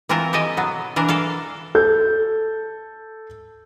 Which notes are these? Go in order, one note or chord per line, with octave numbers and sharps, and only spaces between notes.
E3 C4 E4 F4 A#4
G4 A4 D#5 G#5
B2 F#3 B3
E3 D4 A#4
A4 D5 F5
A4 G6